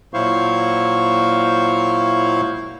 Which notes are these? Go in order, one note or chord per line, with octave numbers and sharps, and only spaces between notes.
A#2 F#3 E4 C5 F5 C#6